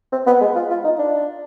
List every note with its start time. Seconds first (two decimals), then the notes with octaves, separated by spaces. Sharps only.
0.12 C4
0.27 B3
0.41 G#3
0.55 F4
0.70 F4
0.85 D#4
0.99 D4